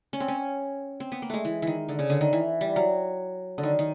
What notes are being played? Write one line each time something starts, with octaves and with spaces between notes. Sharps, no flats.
C#4
C4
C#4
C4
B3
A#3
G#3 A3
E3
D#3 E3
D3
C#3
D3
D#3
E3
G3
F#3
D3
D#3
D#3